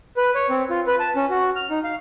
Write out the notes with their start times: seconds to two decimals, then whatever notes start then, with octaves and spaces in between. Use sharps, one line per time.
0.17 B4
0.35 C#5
0.49 C4
0.70 F4
0.87 B4
1.00 A5
1.16 C#4
1.30 F#4
1.56 F6
1.70 D#4
1.84 F5